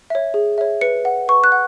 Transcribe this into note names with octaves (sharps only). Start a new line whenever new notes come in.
C#5 E5
G#4
C#5 E5
B4 C#7
F#5
B4 C#6
F#6
F#5